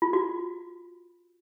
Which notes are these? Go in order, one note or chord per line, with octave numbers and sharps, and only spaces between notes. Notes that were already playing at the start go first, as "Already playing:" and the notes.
F4
F#4